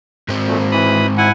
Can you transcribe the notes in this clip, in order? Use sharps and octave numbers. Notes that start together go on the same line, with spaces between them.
G#2 C4
A#2 A3
A#3
E3 B5 D#6
E4 F#5 G#5